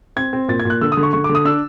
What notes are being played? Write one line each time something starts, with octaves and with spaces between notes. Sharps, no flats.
C4 G#6
C4
A#2 A6
G#6
A#2
F#6
D3 E6
D#6
D3
C#6
D3 C#6
D6
D3
D#6
D4 E6